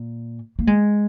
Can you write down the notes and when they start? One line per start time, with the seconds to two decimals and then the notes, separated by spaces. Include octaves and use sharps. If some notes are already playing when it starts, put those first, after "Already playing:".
Already playing: A#2
0.59 A#3
0.67 G#3